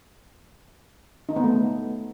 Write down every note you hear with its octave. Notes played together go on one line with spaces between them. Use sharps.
D#4
B3
A3